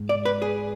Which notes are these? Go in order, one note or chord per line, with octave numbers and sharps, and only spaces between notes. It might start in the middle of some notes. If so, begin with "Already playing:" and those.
Already playing: G#2
D5
B4
G#4